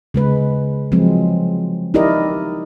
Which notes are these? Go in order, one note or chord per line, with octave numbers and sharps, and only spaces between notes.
C#3 G#3 B4
F3 F#3 G#3 C4
D#4 E4 G4 A#4 D5 D#5